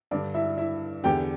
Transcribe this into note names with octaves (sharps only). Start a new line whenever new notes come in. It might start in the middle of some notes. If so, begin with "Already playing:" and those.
G2 D3 D4 D5
E4 E5
E4 E5
E2 D3 G4 G5